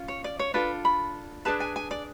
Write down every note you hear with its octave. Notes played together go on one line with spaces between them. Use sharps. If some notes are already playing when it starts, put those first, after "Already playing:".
Already playing: C#4 F4
C#5
D5
C#5
D4 F4 A4 B4
B5
D4 G#4 B4 A5
G#5
G#5
D5